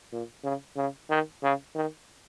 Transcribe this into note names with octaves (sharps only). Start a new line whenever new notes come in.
A#2
C#3
C#3
D#3
C#3
D#3